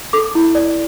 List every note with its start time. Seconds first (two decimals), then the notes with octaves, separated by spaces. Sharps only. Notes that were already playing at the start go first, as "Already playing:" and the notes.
0.13 A4 D6
0.35 E4
0.55 D5